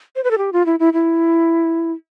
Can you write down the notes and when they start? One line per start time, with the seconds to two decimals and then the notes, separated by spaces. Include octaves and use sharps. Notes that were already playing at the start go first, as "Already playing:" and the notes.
0.16 C5
0.24 B4
0.31 A4
0.38 G4
0.53 F4
0.66 E4
0.79 E4
0.93 E4